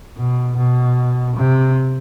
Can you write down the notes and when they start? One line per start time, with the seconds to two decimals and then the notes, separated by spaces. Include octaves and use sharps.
0.17 B2
0.57 B2
1.36 C3